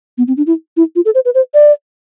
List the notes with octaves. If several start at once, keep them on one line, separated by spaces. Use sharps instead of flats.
B3
C4
D4
E4
E4
F4
A4
C5
B4
C5
D5